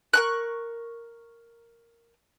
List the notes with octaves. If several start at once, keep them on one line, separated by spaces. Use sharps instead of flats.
A#4 C#6 F#6